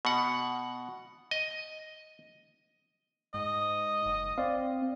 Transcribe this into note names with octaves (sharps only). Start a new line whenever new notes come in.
B2 F#5
D#5
G#2 D#5
F#1
C4 D5 F5